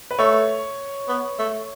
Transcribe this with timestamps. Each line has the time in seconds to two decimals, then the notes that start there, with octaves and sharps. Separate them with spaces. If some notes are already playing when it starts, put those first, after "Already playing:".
0.11 B4
0.18 A3 C#5
1.08 B3
1.39 A3